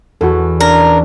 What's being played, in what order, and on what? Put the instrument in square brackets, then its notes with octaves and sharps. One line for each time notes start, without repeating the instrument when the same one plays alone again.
[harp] E2 [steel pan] F#4 A4
[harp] C#4 [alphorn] D4 [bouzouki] A#4